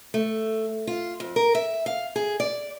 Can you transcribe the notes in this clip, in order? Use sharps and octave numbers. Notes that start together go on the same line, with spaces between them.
A3
F4
F2
A#4
E5
F5
G#4
D5